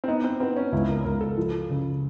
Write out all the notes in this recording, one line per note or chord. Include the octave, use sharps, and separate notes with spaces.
C4
B3 D#4
C4
B3 C4
C#4
C#2 E4
A#4
C#2 A#4
A4
F3
C#3